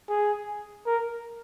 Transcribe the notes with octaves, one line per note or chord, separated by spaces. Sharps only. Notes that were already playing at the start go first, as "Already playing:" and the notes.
G#4
A#4